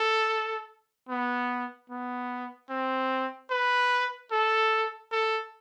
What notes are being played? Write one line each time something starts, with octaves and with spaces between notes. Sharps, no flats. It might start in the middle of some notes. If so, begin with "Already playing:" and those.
Already playing: A4
B3
B3
C4
B4
A4
A4